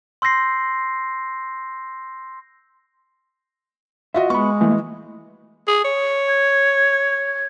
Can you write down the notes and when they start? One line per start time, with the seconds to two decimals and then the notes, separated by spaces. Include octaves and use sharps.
0.22 C6 E6 G6 A#6 C7
4.14 F4 F#4 D#5 E5
4.30 G#3 B3 B5 C#6
4.61 E3 A3 A#3
5.68 G#4
5.85 C#5
6.28 G#6